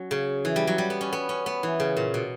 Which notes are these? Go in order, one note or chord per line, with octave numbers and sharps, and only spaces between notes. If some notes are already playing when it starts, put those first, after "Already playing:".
Already playing: F#3 C#4
C#3
E3
G3
F#3
G3
B3
C#4
B3
C#4
B3
E3
C#3
A#2
B2